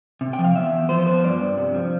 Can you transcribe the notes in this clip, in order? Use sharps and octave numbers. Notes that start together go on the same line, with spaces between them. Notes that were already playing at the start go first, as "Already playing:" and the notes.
C3
G5
F3
F5
E2 E5
E2
F3 C5
B3 C5
G2 D5
G2
C3
F3